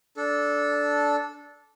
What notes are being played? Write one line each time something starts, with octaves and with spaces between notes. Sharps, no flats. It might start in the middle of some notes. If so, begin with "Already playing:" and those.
D4 A4